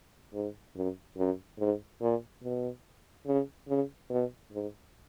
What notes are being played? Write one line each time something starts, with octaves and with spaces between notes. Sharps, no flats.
G#2
F#2
F#2
G#2
A#2
B2
C#3
C#3
B2
G#2